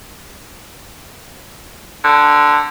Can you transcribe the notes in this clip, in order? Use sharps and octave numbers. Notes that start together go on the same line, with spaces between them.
D3